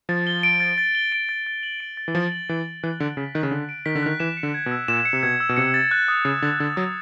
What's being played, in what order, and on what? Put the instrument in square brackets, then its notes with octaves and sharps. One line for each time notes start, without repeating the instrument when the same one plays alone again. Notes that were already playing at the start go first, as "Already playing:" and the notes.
[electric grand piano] F3 [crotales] A6
[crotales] G7
D7
A6
A6
G7
D7
A6
A6
F#7
D7
A6
[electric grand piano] E3
[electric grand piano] F3 [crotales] A6
[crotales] F#7
[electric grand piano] E3 [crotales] D7
[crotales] A6
[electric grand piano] E3 [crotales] F#6
[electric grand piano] D3 [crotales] D7
[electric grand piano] C#3 [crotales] B6
[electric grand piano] D#3 [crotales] F#6
[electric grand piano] C#3
[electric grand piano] D3 [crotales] F#6
[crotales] D7
[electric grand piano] D#3 [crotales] B6
[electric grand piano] D3
[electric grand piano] D#3 [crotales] F#6
[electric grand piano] E3 [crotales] E7
[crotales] C#7
[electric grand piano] D3
[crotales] G#6
[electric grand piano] B2
[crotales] E6
[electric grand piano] A#2 [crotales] E7
[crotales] C#7
[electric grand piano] C3
[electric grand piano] B2 [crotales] G#6
[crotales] E6
[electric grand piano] B2
[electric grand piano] C3 [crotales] C#7
[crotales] A6
F#6
D#6
[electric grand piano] C#3 [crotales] C#7
[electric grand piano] D3 [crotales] A6
[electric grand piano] D3 [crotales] F#6
[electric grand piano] F#3 [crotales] D#6